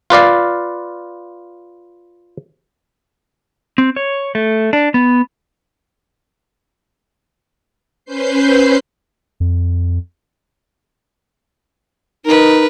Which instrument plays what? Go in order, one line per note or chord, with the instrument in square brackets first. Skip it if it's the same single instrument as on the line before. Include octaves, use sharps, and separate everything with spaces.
[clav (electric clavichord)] F4 B4 D5 F5
[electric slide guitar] C4
C#5
A3
D4
B3
[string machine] C#4 B4 C5 G6 C7
[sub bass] F2
[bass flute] D#4 [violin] A#4 B4